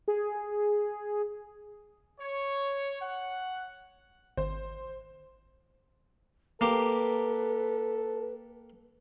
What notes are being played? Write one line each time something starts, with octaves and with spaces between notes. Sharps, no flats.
G#4
C#5
F#5
G#1 C5
A#3 G4 A4 B4